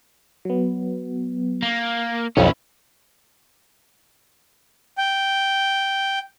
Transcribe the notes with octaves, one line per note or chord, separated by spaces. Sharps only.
F#3 B3
A#3
B1 F2 E3 C#4 E4
G5